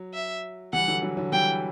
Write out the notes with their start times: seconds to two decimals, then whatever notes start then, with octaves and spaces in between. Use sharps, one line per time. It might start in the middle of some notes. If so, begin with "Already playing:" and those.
Already playing: F#3
0.14 E5
0.73 E3 G3 F#5
0.88 D3 F#3
1.03 D3 F#3
1.17 D3 F#3
1.32 E3 G3 G5